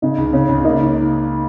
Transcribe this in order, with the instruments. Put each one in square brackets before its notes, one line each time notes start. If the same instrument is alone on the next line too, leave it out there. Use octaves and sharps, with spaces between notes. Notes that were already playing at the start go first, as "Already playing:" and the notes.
[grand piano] C#3 [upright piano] D#4
[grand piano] C#2
[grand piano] C#3 [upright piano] C#4
[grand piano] C#2
[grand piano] A#3 [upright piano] D#4